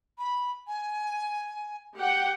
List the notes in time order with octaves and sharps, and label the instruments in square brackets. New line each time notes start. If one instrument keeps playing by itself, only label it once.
[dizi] B5
G#5
[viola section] G4 F#5 G5